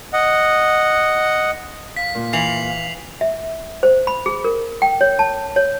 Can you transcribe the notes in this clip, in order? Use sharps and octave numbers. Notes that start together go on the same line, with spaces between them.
D#5 F#5
F5 B6
A#2
E3 C7 F7 F#7
E5
C5
B5
G#4
A#4
G5
C#5
A5
C#5